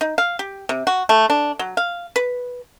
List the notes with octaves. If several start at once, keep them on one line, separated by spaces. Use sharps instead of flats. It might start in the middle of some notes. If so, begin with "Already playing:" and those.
D#4
F5
G4
C3
F#4
A3
D4
F#3
F5
B4